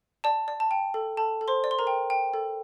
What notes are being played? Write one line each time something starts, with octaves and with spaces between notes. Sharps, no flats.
D5 A5
D5
A5
G5
A4
A4 A5
A4
C5 C6
D5
C6
A#4 A#5
G5
G5
A4